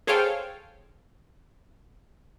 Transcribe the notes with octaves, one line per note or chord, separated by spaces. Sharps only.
G#4 A4 C5 C#5 F5 G5